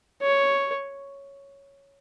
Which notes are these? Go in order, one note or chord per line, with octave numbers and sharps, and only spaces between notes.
C#5